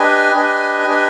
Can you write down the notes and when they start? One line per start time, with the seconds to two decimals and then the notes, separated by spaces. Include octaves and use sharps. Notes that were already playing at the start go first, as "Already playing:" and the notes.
Already playing: D4 G4 B4 D#5 G#5
0.33 D4 G4 B4 D#5 G#5
0.87 D4 G4 B4 D#5 G#5